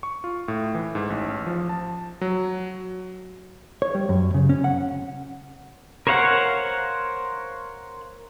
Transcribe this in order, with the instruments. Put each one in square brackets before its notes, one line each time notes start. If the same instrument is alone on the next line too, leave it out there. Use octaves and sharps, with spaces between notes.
[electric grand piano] C#6
F4
A2
E3
G#2
A1
F3
A5
F#3
[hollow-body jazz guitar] C#5
G3
F#2
C#3
C#4
F#5
[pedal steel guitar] A#4 C5 C#5 F5 F#5